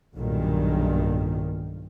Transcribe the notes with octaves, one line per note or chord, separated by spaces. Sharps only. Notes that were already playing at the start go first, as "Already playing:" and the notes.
B1 G2 A#2 D#3